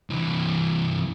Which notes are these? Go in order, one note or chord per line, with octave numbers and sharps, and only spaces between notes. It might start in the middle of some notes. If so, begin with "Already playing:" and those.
C2 E3